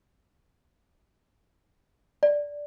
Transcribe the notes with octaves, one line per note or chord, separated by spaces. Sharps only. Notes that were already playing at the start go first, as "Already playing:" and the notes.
D5